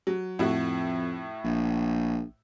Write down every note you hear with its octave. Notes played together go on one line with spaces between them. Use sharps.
F#3
F2 A2 E4 F#4
A#1